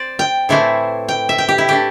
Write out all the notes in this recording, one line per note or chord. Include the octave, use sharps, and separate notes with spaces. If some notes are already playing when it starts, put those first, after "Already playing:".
Already playing: C4 C5 D5
G5
A2 E3 A3 C4 E4
G5
E5
G5
G4
E4
E3 A3 D4 G4